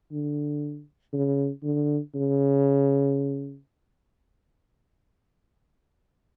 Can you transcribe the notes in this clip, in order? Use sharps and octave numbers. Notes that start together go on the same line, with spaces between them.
D3
C#3
D3
C#3